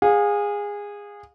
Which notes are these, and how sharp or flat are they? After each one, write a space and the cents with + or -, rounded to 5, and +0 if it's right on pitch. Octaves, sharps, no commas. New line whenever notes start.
G#4 -20 F5 +30